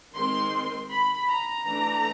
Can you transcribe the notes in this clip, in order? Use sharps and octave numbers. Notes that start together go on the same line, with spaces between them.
D#3 G#3 C4 C6
B5
A#5
E3 A3 D4